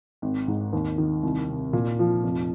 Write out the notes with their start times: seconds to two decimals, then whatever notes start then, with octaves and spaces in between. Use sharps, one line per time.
0.22 G#1
0.48 G#2
0.73 D#2
0.98 D#3
1.23 C2
1.48 C3
1.73 A#2
1.99 F3
2.24 F1